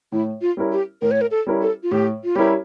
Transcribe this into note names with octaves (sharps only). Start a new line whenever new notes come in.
A2 E4
F4
G3 C#4 E4 A#4
G4
A2 A#4
C#5
A#4
A4
G3 C#4 E4 A#4
A4
F4
A2 G4
F4
G3 C#4 E4 G4 A#4